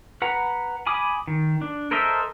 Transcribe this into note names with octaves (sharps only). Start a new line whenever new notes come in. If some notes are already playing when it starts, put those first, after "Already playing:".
B4 F#5 A#5
G#5 B5 D6 D#6
D#3
D4
A4 A#4 C5 D#5 E5